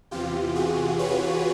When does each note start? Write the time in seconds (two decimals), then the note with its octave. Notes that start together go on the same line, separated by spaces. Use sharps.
0.11 E2 C3 E3 F4 G4
0.55 F#4 G#4
0.99 B4 C#5